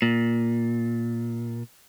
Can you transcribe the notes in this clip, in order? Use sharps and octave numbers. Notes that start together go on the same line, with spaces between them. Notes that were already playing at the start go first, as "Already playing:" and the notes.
A#2